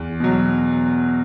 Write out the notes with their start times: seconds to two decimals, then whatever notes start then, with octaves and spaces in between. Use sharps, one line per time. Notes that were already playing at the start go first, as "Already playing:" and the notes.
Already playing: E2
0.20 B2 F#3